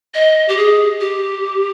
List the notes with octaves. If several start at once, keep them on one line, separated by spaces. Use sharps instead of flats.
D#5
G4
G#4
G4